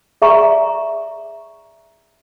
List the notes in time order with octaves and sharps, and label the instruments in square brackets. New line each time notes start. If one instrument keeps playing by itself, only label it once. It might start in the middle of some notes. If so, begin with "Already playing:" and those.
[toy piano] G#4 D5 E5 G#5 A#5 C#6